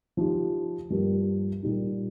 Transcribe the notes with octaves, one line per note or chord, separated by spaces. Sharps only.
F3 D#4 G4
G2 F3 A#3 G4
A#2 G3 D#4